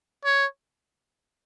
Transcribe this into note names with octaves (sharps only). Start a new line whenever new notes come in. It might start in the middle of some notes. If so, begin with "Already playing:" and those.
C#5